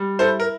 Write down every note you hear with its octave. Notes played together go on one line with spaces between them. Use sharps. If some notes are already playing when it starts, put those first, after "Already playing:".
Already playing: G3
E4 A4 C5
A#4